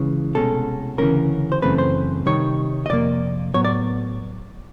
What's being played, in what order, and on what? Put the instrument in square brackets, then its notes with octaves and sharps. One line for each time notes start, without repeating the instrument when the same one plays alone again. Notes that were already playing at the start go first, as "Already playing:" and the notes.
Already playing: [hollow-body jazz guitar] C#2 C#3 E3
C2 B2 G#3 C#4 A4
D2 C#3 E3 G#3 C#4 A#4
C5
F#2 C#3 E3 A3 C4 B4
C5
C3 D#3 G3 C#5
D#5
F2 C3 A#3 D5
A2 F#3 B3 C#5
D5